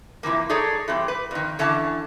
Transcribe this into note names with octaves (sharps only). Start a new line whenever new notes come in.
C3 E3 F3 A#3
D#4 G#4 A4 C#5 D5
E3 G3 C4
B4
F2 D#3
D3 E3 C#4 A5